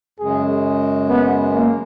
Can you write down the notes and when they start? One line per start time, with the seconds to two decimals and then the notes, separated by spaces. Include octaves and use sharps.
0.19 F#2 C#3 G#3 G#4
1.09 B3
1.54 A#3